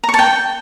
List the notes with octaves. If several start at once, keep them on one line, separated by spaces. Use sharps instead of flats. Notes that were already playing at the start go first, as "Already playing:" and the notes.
A#5
C#6
A5
G5